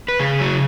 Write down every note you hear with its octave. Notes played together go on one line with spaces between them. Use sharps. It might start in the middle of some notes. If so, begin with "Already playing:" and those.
B4
C#3 G#4
F#3